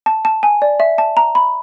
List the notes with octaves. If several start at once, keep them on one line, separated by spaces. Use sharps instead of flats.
A5
A5
G#5
D5
E5
A5
A#5
B5